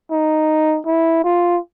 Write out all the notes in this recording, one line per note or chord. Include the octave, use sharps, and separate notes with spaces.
D#4
E4
F4